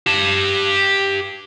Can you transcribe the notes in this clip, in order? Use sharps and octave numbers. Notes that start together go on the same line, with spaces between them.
G4 A5